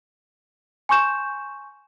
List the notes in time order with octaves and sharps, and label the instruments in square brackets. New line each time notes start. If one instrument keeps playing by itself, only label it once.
[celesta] G#5 C6 C#6 G6 E7